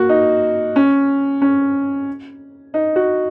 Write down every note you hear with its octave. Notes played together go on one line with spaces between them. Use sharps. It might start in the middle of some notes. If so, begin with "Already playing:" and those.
Already playing: A#3 F#4
D#4
C#4
C#4
D#4
F#4